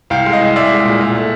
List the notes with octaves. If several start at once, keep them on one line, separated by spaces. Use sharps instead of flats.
C2 F5 G5
G#3
D#5 F5
C2
G#3 D5 E5
G#3
A#2
A#2
A3